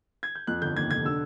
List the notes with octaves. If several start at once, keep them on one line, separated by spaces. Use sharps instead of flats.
G#6
G6
F2 F#6
G1 G6
D#2 G#6
F1 G#6
D3 E6